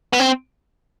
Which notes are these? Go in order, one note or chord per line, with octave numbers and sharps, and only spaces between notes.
B3
C4